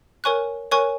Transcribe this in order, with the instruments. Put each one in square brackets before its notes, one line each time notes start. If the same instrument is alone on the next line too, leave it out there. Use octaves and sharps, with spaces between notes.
[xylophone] A#4 C#5 G#5 C#6 F#6
A#4 C#5 G#5 C#6 F#6